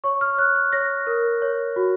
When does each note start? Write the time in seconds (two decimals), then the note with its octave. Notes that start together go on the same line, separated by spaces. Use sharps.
0.04 C#5 C#6
0.21 F6
0.38 C#5 F#6
0.55 F#6
0.72 C#5 A#6
1.07 A#4
1.42 C#5
1.76 F#4